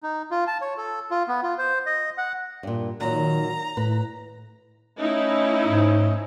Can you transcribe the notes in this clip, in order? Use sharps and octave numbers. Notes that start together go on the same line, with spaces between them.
D#4
F4
A5
C#5
A4
F4
B3
F4
C5
D#5
F#5
G2 A#2
A#2 D#3 F#3 A#5
A2 B4
A3 C#4 D#4 E4 D#5
G#2